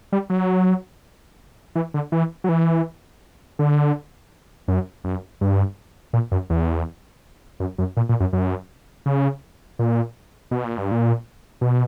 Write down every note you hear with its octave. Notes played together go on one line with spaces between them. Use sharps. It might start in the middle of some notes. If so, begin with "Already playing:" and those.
G3
F#3
E3
D3
E3
F#3
E3
D3
F#2
F#2
G2
A#2
F#2
E2
F#2
F#2
A#2
A#2
F#2
F#2
C#3
A#2
B2
A#2
G2
A#2
B2